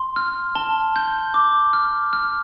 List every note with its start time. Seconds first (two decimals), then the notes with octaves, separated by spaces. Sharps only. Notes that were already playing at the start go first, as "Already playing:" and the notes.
Already playing: C6
0.16 F6
0.55 A5 G7
0.96 G6
1.34 D6
1.73 F6
2.13 F6